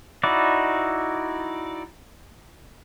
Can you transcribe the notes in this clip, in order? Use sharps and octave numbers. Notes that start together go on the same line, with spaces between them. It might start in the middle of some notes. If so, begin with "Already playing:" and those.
D#4 E4 F#4 D5